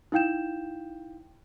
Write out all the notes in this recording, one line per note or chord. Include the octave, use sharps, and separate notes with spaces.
D#4 E4 F5 G5 G6 E7